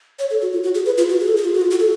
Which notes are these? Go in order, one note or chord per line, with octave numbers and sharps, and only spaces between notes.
C#5
A4
F#4
F4
F#4
G#4
B4
F4
F#4
G#4
A4
G#4
F4
F#4
F4
F#4
A4